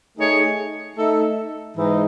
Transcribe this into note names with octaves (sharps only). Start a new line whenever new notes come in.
A3 D#4 G#4 C#5
A3 D#4 A4 E5
G#2 E3 G#3 D#4